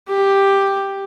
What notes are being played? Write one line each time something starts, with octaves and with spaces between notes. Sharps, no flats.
G4